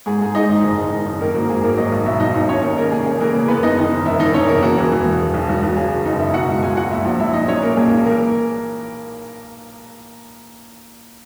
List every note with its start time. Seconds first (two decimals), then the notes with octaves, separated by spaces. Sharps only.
0.06 G#2 G#4
0.21 G#2 G#4
0.35 G#2 D#4 D#5
0.49 G#1
0.63 F#1
0.78 G#3
0.92 D#3
1.06 F#2
1.21 D#3 A#3 A#4
1.35 G#1 F#4
1.49 G#1 G#4
1.63 G#1 A#3 A#4
1.77 F#3 D#4 D#5
1.92 B1
2.06 B2 E4 E5
2.20 B1 D#4 D#5
2.34 D#2 D#4 D#5
2.49 D#2 C#4 C#5
2.63 D#3
2.77 G#3 A#3 A#4
2.92 C#3 G#4
3.06 C#3 G#4
3.20 E3 A#3 A#4
3.34 C#3
3.48 F#1 B3 B4
3.63 F#1 D#4 D#5
3.77 D#3
3.92 F#1
4.06 E1 E4 E5
4.20 E1 D#4 D#5
4.34 E1 C#4 C#5
4.49 C#3 A#3 A#4
4.62 E1 F#4
4.77 E3
4.92 E3
5.06 E1
5.21 G#3
5.34 B1
5.49 B1 F#4
5.63 B1 F#4
5.76 C#3 G#4
5.92 F#1
6.05 F#1 D#4 D#5
6.19 F#1 E4 E5
6.34 B2 F#4 F#5
6.49 C#2
6.63 C#2 G#4 G#5
6.77 C#2 F#4 F#5
6.91 A#2 E4 E5
7.05 A#1
7.20 A#1 E4 E5
7.33 A#2 D#4 D#5
7.48 F#3 C#4 C#5
7.62 A#2 A#3 A#4
7.76 B1 G#4
7.91 B1
8.05 E3 A#3 A#4